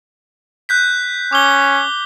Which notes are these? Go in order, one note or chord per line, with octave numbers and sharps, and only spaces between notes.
F#6 G6 B6
C#4 D6 G7